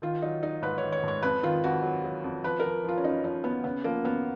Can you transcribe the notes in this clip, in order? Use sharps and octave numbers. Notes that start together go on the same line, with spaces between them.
D#3 F4
F#3 D#4
F#3 D#4
G#2 B4
C#5
D#3
C#5
G#2 C#5
F2 B4
D#3 F4
F2 F#4
F#3
F#3
F2
F3 B4
F3 A#4
F3 F4
C#4
F#2 D#4
F3 D#4
F#2 B3
C#3 B3
F3 A#3
F#2 B3